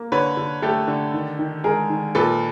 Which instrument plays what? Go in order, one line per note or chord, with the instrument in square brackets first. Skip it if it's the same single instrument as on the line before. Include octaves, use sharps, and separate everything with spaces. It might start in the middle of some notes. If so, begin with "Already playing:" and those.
Already playing: [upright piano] A#3
D3 B4 C#5
D3
A3 G4 A4
D3
D#3
D#3
G#3 G#4 A#4
D#3
A#2 A4 B4